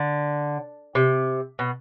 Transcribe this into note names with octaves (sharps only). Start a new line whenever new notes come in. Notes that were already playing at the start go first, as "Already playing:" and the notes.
Already playing: D3
C3
B2